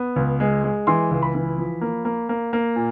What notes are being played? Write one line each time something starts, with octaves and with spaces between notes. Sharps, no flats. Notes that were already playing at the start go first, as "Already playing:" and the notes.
Already playing: B3
C#2
G#3
G#3
E3 C6
C#2
B5
E3
F3
A#3
A#3
A#3
A#3
A#2